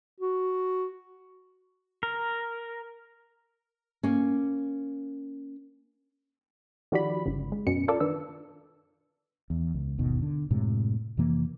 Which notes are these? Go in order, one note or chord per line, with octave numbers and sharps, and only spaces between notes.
F#4
A#4
A#3 C#4
D#3 F3 F#4 G4 D5 B5
G1 C#2
G#3
F#2 B2 C#4 C#7
F4 A4 A#4 D5
D#3 D4 B4 E6
E2
C#2
G1 D#2 B2 D#3
D3
F#2 A2 C3 G#3
F2 C3 E3 A#3